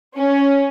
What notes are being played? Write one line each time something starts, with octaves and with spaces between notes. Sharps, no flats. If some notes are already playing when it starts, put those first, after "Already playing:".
C#4